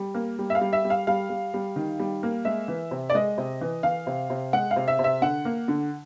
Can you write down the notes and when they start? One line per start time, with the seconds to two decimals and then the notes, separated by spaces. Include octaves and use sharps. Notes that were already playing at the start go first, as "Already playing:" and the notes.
Already playing: G3
0.14 A#3
0.39 G3
0.50 E5
0.55 F5
0.61 G3
0.73 E5
0.84 G3
0.90 F5
1.07 G3 F5
1.30 G3
1.54 G3
1.76 D#3
1.99 G3
2.23 A#3
2.45 G#3 E5
2.68 E3
2.91 C3
3.10 D5
3.15 G#3 D#5
3.38 C3
3.61 E3
3.83 E3 F5
4.07 C3
4.30 C3
4.53 G#3 F#5
4.71 F5
4.76 C3
4.88 E5
4.99 C3
5.04 E5
5.22 D3 F#5
5.45 A#3
5.68 D3